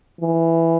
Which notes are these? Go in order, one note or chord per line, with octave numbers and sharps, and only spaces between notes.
E3